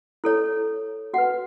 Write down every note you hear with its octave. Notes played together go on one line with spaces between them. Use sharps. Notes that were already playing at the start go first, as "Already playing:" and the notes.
E4 A4 C#5
F#4 B4 F#5